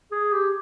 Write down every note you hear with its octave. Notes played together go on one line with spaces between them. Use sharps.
G#4
G4